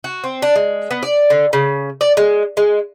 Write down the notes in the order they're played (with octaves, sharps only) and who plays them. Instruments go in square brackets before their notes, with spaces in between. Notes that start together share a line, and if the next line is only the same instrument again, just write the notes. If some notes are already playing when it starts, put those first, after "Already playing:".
[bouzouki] F#4
C4
D4
G#3
B3
D5
D3
C#3
D5
G#3
G#3